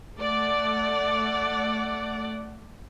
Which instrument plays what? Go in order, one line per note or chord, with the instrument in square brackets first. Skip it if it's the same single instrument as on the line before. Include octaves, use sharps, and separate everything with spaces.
[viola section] A3 D5 F#5